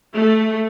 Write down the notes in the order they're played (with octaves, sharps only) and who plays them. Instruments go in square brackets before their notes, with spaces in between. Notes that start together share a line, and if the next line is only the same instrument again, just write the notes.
[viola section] A3